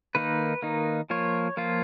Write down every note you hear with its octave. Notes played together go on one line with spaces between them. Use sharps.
D#3 A#3 D#4 B4
D#3 A#3 D#4
F3 A#3 F4 C#5
F3 A#3 F4